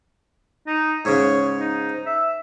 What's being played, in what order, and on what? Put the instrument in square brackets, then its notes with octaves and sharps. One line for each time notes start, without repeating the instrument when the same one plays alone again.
[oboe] D#4
[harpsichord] G#2 C#3 [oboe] C#5
[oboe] D#4
E5